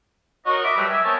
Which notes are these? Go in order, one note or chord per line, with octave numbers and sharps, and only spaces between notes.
D#4 F#4 A#4 C#5 D#5
D#5 E5 B5 D6
F#3 G3 A3 B4
E5 G#5
B3 C4 A#4 C#5 G#5 A5